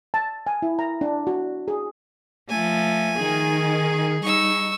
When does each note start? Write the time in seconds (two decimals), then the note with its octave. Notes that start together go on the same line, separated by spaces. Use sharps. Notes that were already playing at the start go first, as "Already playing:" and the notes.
0.14 A5
0.47 G#5
0.62 E4
0.79 A#5
1.01 D4
1.27 F#4
1.68 G#4
2.50 F3 A3 G#5
3.18 D#3 G#4
4.23 G3 D#4 C#6 E6